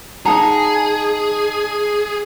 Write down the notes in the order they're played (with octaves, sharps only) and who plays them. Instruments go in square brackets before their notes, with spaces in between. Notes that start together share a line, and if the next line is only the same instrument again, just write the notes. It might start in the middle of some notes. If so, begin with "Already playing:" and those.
[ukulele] D#4 F#5 A#5 [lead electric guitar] G#4 [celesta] A5